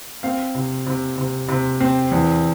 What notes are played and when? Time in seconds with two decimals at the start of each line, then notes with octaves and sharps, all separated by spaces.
0.23 C4 F5
0.55 C3
0.86 C3
1.17 C3
1.48 C3
1.80 C4
2.11 E2